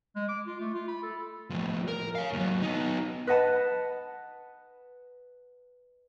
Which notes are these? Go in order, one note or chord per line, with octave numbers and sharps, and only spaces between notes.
G#3
D6
F4
A3
F4
B5
A4
A2 F3
A#4
C#5 F5
D#2 F#3
B3 D#4
B4 D#5 F#5 A5 B5